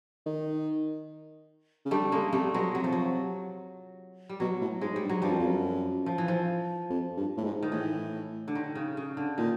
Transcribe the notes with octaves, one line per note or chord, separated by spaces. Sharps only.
D#3
C#3
D3 G3 A3
C#3 G#3 A#3
C3 G3 A3
B2 F#3 G#3
C3 F#3
F3
F#3
G3
B2 F#3
A2
G#2 G#3
G3
G2
F#3
G2 F3 G3
F#2
F2
F#2
F3
E3
F3
F2
G2
A2
G#2
D#3
A2 E3
D3
D#3
C#3
C#3
D3
A#2 D#3